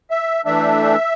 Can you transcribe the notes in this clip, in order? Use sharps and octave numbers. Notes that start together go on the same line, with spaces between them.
E5
E3 A3 D4 E5